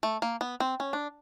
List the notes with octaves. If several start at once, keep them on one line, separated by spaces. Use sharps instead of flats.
A3
A#3
B3
C4
C#4
D4